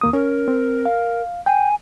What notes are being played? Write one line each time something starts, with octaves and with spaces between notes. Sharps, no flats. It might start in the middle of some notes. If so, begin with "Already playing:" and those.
D#2 A#3 D#6
C#4 A#4
C4
F5
G5 G#5